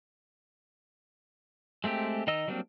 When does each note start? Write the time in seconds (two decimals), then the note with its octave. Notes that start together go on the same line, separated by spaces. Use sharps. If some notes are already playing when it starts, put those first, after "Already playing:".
1.84 G#3 A3 C4 G4
2.27 D#3 D#4 D#5 E6
2.48 F#3 G3 A#3 C4 D4